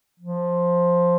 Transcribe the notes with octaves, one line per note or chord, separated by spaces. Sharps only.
F3